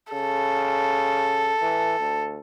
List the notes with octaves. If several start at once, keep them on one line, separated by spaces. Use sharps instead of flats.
C#3 A4
E3
D2